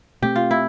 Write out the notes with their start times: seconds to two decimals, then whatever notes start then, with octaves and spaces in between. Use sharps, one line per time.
0.22 B2 A3 C4 G4
0.36 F4
0.51 E4